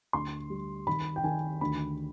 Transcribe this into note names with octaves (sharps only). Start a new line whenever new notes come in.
D2 C6
G3
D#3 B5
G5
D#3 G#5
D2 B5